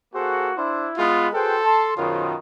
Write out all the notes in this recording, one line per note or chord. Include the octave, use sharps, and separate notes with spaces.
A#3 F#4 G#4 A4 C5
D4 E4 C5
G#3 B3 F4
F#4 G#4 A4 B4 C5 G5
A5 C6
F#2 B2 D#3 F4 G#4 C5 C#5